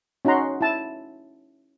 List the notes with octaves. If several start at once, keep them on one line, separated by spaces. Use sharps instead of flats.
C#4 D#4 F#4 F#5 A#5 C6
E4 A5